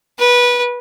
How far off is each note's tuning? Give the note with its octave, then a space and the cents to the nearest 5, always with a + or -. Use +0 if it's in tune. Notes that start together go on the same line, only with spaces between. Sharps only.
B4 -20